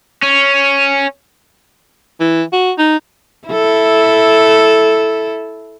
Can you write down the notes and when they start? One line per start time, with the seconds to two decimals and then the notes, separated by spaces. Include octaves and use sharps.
0.23 C#4
2.20 E3
2.53 F#4
2.78 D#4
3.48 E4 A4